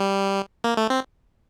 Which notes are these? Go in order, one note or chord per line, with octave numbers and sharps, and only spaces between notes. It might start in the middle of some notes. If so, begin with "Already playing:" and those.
Already playing: G3
A#3
A3
C4